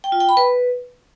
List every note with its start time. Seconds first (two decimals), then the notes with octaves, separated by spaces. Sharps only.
0.04 G5
0.12 F4
0.20 G5
0.29 B5
0.37 B4